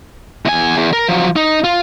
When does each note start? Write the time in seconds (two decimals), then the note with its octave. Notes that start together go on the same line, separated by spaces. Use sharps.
0.46 E2 G#5
0.77 E2
0.93 A#4
1.09 F3 F#3
1.36 D#4
1.64 F4